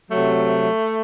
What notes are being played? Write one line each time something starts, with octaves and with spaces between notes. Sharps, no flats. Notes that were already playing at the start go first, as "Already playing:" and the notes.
C3 F#3 A3